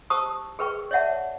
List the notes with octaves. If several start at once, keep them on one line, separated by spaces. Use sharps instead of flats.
G4 C5 A5 C#6 D#6 E6
G#4 A#4 B4 G5 C#6
C#5 D5 E5 F#5 A5